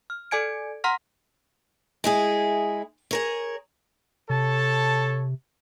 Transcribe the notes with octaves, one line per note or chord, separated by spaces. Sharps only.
F6
A4 D5 G#5 G#6 D7
F#5 A#5 C6 F6 A#6
G#3 E4 G#4
G#4 A#4 C#5
C3 A4 C#5 A5